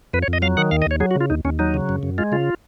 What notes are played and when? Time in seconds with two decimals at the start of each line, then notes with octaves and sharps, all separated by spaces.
0.13 F2 B4
0.22 C#5
0.28 F2
0.33 D#5
0.42 F#3 F5
0.57 D#3 F#5
0.71 D#2 F5
0.82 D#5
0.86 D#2 C#5
1.00 F#3 G#4
1.11 F#4
1.16 C#3 F4
1.30 D#2 D#4
1.45 D#2 C#4
1.59 F#3 D#4
1.74 C#3
1.89 F#2
2.03 F#2
2.18 G#3 F4
2.32 C#3 F4